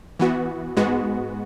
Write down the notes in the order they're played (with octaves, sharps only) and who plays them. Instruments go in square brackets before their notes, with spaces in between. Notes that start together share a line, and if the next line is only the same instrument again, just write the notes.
[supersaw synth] E3 B3 F#4
G#2 G#3 B3 F#4